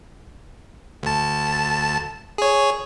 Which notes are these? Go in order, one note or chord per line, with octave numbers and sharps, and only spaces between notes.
D2 A5
G#4 C#5